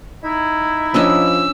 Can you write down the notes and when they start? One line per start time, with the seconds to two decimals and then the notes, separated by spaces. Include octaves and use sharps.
0.23 D#4 E4
0.94 F3 C#4 D4 D#5 E6